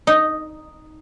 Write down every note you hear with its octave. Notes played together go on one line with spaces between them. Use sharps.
D#4